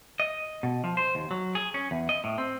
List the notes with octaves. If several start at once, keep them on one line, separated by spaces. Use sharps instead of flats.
D#5
B2
F3
C5
D#2
F#3
G#4
C#4
E2
D#5
A2
C4